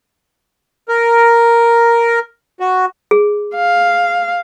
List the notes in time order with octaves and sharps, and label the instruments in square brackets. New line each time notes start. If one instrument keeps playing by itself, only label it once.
[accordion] A#4
F#4
[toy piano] G#4
[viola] F5